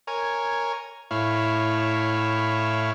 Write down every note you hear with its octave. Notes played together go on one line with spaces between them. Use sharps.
A#4 C#5 G#5
A2 E4 C#5 F5